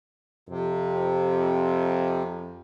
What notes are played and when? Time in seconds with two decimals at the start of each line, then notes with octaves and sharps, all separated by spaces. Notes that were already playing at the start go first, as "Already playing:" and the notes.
0.49 F2 C3